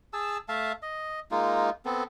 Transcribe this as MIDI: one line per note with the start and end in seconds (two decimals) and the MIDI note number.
0.13 0.38 68
0.13 0.38 81
0.13 0.38 88
0.49 0.72 57
0.49 0.72 76
0.49 0.72 77
0.49 0.72 81
0.82 1.20 75
1.31 1.70 56
1.31 1.70 58
1.31 1.70 63
1.31 1.70 65
1.85 2.03 59
1.85 2.03 60
1.85 2.03 69